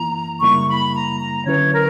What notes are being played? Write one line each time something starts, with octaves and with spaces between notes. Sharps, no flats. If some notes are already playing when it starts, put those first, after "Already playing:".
Already playing: F#2 E3 A#3 E4 A#5
F#2 C#3 G3 A#3 E4 C#6
B5
A#5
A#5
D3 F#3 C#4 E4 B4 C#5
A#4